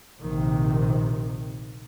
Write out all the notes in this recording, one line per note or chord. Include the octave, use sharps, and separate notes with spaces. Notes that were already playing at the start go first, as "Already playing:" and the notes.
A#1 C3 D#3